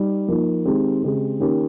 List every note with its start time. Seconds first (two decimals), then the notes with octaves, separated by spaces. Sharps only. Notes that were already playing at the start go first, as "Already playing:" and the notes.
Already playing: G3 D#4
0.28 F3 A#3 D#4
0.65 D#3 G#3 C4 G4
1.03 C#3 G#3 C4 G4
1.39 D#3 A#3 C#4 G4